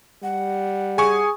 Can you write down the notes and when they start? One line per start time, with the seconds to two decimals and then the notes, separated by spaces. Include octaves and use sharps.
0.23 G3 F#5
0.98 G#4 G#5 C#6